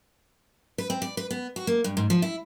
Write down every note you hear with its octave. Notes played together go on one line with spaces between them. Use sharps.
B4
C4
D5
B4
B3
F#4
A#3
G2
G#2
F3
E4